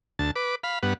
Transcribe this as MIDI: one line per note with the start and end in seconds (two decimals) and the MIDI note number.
0.19 0.31 38
0.19 0.31 81
0.36 0.55 71
0.36 0.55 86
0.63 0.79 77
0.63 0.79 83
0.83 0.94 43
0.83 0.94 59
0.83 0.94 78